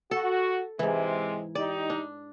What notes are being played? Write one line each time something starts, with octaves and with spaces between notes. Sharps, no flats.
F#4 A4
G#2 C3 E3 G#3
D#4 G4 D5
D4